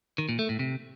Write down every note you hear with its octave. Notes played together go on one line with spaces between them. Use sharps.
D#3
A#2
A3
A2
C3